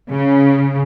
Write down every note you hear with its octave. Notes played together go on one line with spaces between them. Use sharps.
C#3